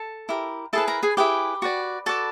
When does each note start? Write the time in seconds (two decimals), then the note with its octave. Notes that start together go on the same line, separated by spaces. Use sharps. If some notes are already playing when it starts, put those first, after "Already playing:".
Already playing: A4 A5
0.29 E4 G4 A#4
0.73 E4 G#4 A4 B4 A5
0.88 A#4 A#5
1.03 G#4 G#5
1.17 E4 G4 G#4 B4 G5
1.62 F#4 B4 D5
2.06 F#4 A4 B4 D5 A5